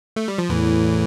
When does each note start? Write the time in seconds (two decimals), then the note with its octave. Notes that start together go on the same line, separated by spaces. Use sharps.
0.16 A3
0.28 G3
0.38 F3
0.50 E2 A2 E3